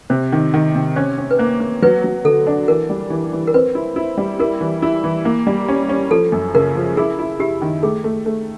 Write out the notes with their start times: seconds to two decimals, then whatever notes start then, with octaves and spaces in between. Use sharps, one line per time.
0.10 C3 C5
0.32 D#3
0.54 D#3
0.75 C3
0.96 C#4 C5
1.18 C#4
1.31 B4
1.39 A#3 C5
1.60 A#3
1.82 F#3 B4
2.04 F#3
2.25 D3 A4
2.47 D4
2.68 E3 A#4
2.89 G3
3.10 E3
3.33 E3
3.47 A#4
3.54 C4 B4
3.75 E4
3.96 E4
4.17 G3
4.39 E4 A#4
4.61 E3
4.82 E4
5.04 E3
5.25 A#3
5.47 G3
5.68 C#4
5.89 C#4
6.11 F3 A4
6.32 F#2
6.55 C#3 A#4
6.75 F3
6.97 E4 G#4
7.19 E4
7.39 E4 G4
7.62 D#3
7.83 A3 G#4
8.04 A3
8.26 A3